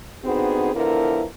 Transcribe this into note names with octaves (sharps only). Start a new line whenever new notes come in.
D3 B3 C4 D#4 F#4 G#4
D3 F3 B3 E4 A#4